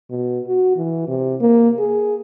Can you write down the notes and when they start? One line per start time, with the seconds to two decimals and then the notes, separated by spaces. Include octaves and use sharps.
0.10 B2
0.47 F#4
0.77 E3
1.08 C3
1.40 A#3
1.79 G#4